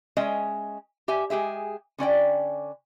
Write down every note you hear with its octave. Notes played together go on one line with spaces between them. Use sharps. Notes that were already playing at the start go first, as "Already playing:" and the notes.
G#3 C#4 D#5 E5
G4 E5 G#5
G#3 G4 G#4 E5
D3 C#4 D5 G5